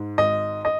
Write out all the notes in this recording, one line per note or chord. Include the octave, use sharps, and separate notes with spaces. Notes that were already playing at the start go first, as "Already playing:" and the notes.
Already playing: G#2
G#1 D#5
D#5